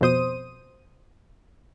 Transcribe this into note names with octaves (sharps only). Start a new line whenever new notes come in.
F2 B2 C5 D#6 D#7